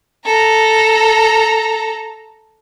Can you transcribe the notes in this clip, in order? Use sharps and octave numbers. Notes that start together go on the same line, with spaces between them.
A4 A#5